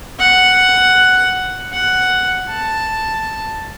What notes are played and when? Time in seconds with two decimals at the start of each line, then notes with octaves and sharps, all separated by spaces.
0.19 F#5
1.72 F#5
2.49 A5